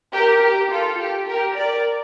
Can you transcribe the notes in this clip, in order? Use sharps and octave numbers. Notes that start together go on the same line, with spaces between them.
G4 A#4
G4
F4 A4
G4
G4 A#4
A#4 D5